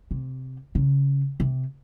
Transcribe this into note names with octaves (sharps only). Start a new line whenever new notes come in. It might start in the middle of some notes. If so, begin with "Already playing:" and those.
C3
C#3
C3